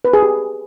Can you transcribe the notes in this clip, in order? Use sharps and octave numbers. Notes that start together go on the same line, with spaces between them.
B4
G#4
G4